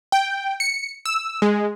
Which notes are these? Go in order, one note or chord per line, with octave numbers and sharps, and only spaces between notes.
G5
C#7
E6
G#3